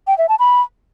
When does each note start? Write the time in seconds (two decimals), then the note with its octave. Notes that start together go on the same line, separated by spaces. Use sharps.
0.07 G5
0.18 E5
0.29 A5
0.39 B5